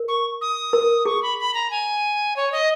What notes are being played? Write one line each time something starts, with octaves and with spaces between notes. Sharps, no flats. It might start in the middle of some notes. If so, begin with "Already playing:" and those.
Already playing: A#4
C#6
D#6
A#4
G#4 C#6
B5
B5
A#5
G#5
C#5
D#5